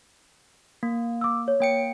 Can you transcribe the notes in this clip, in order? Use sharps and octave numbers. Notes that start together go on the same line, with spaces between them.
A#3
D6 E6
C#5
A#3 G5 C#7